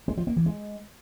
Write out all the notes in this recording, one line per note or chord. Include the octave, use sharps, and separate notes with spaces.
G#3
F3
A#3
E3
G#3